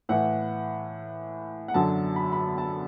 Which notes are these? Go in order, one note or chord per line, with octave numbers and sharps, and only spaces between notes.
A2 E3 F#5
F#5
F#2 D3 F#3 A5
B5
B5
A5